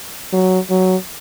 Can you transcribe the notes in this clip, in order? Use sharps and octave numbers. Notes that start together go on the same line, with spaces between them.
F#3
F#3